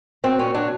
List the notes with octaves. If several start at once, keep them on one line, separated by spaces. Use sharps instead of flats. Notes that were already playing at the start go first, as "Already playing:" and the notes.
F#3 C4
A#2 C#4
F#3 D4